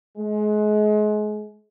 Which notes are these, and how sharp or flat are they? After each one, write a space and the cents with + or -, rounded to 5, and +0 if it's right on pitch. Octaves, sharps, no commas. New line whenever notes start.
G#3 +30